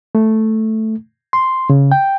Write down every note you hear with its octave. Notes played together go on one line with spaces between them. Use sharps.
A3
C6
C#3
G5